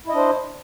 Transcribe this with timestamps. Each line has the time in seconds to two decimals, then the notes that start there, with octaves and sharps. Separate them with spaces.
0.06 E4
0.10 D#5
0.13 D4
0.17 C5